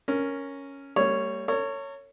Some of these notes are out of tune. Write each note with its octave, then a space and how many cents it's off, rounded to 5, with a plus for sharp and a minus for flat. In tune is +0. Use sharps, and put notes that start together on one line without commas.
C#4 +0 A#4 +0
G3 +10 A#3 -40 C#5 +0
A#4 -45 C#5 +0